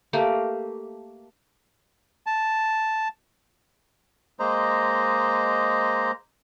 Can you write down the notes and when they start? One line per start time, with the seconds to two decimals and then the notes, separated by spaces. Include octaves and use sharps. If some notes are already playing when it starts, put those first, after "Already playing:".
0.13 A3 A#3 G4
2.27 A5
4.40 G#3 A#3 C5 D#5 A#5